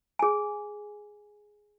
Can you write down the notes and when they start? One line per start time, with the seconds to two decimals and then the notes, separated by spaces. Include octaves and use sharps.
0.19 G#4 G#5